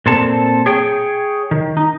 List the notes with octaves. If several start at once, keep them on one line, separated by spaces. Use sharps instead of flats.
A#2 C4 A4 A5
G#4 C#5 G5
D#3
D#4